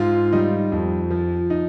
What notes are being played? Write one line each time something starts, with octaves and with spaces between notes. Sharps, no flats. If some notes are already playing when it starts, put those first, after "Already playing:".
Already playing: G#2 F4
G3 D#4
F2
F3
D#4